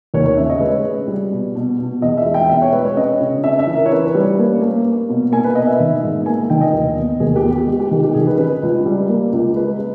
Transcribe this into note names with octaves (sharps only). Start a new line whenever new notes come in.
D#2 C#5
C#5
C#3 E5
D#5
G#3 B4
G#3
G3
B2
B2
B2
E2 D#5
E5
G#3
G5
B2 E5
C#5
G#3 B4
C#5
C#4 D#5
C#3
C#4 E5
E5
E3
A#4
C#5
C#4 B4
B4
G3
C#5
A#3
A#3
A#3
B2
A#3 G#5
B4
B2 D#5
E5
D#3
G#2
A#3 G#5
D#3 G5
D#5
D#2
B3
D#2 G#4
G4
B3
G4
G#3
G4
D#3 G4
G4
D#3 G#4
B4
C#4 B4
C#2
G3
A#3
C#2
G#3 B4
G#3